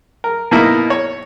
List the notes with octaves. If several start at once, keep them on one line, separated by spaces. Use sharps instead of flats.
A#4
B2 A#3 D#4 E4 A#4
C#5